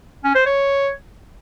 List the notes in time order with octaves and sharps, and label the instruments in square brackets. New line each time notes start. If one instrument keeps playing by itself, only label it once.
[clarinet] C#4
C5
C#5